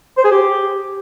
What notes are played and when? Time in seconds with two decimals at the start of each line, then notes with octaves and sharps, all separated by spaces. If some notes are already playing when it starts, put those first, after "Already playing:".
0.18 C5
0.24 G#4
0.31 G4